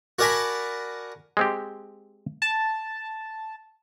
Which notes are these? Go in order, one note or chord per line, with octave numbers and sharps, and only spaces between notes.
F#4 A#4 D5 G#5 A5 B5
G#3 C4 G4
A5